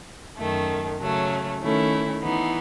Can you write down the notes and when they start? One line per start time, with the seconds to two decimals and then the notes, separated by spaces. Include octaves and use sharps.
0.37 F#2 D#3 A3
0.98 C#3 F#3 A3 C#4
1.60 D#3 A3 C#4 E4
2.21 E3 B3 D#4